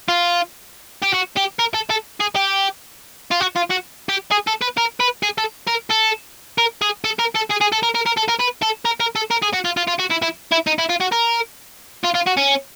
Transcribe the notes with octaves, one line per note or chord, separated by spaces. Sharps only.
F4
G4
F#4
G4
A#4
A4
A4
G#4
G4
F4
F#4
F4
F#4
G4
G#4
A4
B4
A#4
B4
G#4
A4
A#4
A4
A#4
G#4
A4
A#4
A4
G#4
G#4
A4
A#4
A#4
A#4
A4
A#4
B4
A4
A#4
A#4
A4
A#4
G#4
F#4
F4
F4
F4
F#4
E4
E4
E4
D#4
E4
F4
F#4
A#4
F4
F4
F#4
C#4